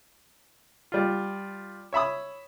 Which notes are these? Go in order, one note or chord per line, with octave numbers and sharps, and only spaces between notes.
G3 F4
C#5 E5 B5 D#6